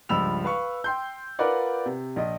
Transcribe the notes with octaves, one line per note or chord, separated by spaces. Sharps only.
C#2 G2 F3 B5 E6 F7
B4 F5 C#6
G5 C6 G6
F4 A#4 B4 D5 F#5
C3
A#1 D#5